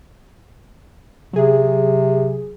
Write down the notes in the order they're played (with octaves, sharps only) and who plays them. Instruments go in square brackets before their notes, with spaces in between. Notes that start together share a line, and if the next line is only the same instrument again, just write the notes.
[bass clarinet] C3 [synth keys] F#3 G#4